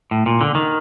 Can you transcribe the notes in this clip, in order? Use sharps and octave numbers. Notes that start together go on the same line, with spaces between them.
A2
A#2
D3
D#3